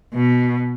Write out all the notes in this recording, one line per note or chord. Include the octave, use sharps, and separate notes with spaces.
B2